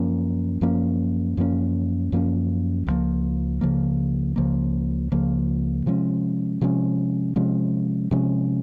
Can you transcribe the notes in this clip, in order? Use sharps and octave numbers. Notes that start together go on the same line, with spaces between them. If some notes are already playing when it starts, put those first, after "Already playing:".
Already playing: F#2 F3 A#3 C#4
F#2 F3 A#3 C#4
F#2 F3 A#3 C#4
F#2 F3 A#3 C#4
C#2 C#3 F3 A#3
C#2 C#3 F3 A#3
C#2 C#3 F3 A#3
C#2 C#3 F3 A#3
C3 F3 G#3 C#4
C3 F3 G#3 C#4
C3 F3 G#3 C#4
C3 F3 G#3 C#4